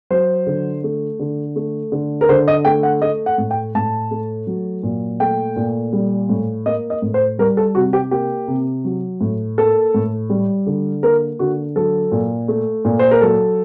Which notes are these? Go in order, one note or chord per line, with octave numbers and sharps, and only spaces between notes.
F#3 C5
D3
A3
D3
A3
D3
A#4
D3 C5
D#5
A3 G5
F#5
A3 D#5
F#5
A2
G5
A2 A5
A3
F#3
A#2
A3 G5
A#2
G3
A2
A#3 D#5
D#5
A2
C5
G3 A#4
A4
C3 F#4
G4
A#3 G4
C3
F#3
A2
A#3 A4
A2
G3
D3
A#3 A#4
D3 F#4
F#3 A4
A#2
A3
A#2
C5
A#4
F#3 A4